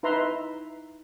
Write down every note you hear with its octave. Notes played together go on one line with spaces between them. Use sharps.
D#4 E4 B4 E5 A#5 C6